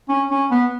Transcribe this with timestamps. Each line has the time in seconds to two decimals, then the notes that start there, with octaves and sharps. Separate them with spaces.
0.09 C#4
0.30 C#4
0.51 B3